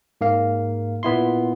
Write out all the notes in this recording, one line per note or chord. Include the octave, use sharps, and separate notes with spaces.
G#2 A#3 F5
A#2 B3 E4 C6